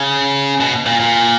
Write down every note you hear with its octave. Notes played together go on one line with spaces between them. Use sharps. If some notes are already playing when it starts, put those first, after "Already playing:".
Already playing: C#3
B2
A#2
A#2